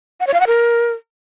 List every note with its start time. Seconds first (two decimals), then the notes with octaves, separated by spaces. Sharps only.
0.20 F#5
0.27 C#5
0.34 F5
0.40 F#5
0.47 A#4